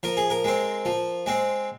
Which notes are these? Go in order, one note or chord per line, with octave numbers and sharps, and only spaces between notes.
F3 A#4
G#4
A#4
G#3 C4
F3
G#3 C4